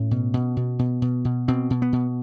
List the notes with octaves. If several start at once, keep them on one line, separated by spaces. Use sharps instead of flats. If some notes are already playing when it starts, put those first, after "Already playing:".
Already playing: A2 C#4
B2
B2
B2
B2
B2
B2
B2 C4
B2
B3
B2